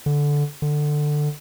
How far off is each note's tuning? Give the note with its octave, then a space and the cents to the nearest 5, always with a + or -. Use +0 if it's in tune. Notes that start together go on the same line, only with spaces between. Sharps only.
D3 -10
D3 +15